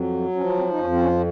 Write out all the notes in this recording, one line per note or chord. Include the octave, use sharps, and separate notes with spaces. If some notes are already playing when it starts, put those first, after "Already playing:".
Already playing: F2 F#3
F3 C#4
C4
D#4
F2 C#4
C4
C#4